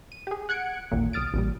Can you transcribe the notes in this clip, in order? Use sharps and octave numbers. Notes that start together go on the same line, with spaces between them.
D#7
G4 G#4
F#5 F#6 G#6 C#7 D7
A1 D#2 A#2
B1 D#6 F6 A6 D7
A1 A#2 G3